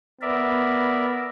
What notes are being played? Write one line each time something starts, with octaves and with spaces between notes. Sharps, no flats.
B3 A#4 D5 E5